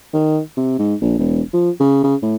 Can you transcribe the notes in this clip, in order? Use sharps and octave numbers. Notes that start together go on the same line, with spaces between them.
D#3
C3
G#2
A#1
E1
F3
C#3
C#3
A2